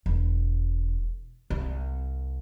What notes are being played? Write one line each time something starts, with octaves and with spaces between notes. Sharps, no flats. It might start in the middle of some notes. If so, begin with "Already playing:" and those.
E1
C2